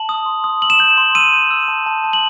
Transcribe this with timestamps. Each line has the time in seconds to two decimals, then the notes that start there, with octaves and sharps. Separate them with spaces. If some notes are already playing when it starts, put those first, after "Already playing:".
Already playing: A5 F#7
0.09 D#6
0.26 C6
0.44 D#6
0.62 E6 F#7
0.70 E7
0.79 G6 F#7
0.97 C6
1.15 E6 D#7
1.33 G6
1.51 E6
1.68 A5
1.86 A5
2.04 A5
2.13 F#7